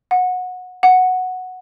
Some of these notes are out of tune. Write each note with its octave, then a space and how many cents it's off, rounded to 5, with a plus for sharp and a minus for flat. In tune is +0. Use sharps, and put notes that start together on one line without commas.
F#5 -20
F#5 -5